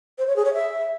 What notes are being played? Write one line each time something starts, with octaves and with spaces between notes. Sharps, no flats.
C5
C#5
G#4
C#5
E5